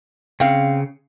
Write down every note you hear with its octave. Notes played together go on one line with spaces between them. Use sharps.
C#3 C4 F5